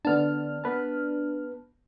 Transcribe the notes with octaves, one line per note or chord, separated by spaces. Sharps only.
D3 B3 D4 A5 F6
B3 B4 A5